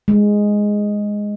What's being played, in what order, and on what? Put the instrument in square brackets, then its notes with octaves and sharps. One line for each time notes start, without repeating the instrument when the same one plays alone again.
[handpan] G#3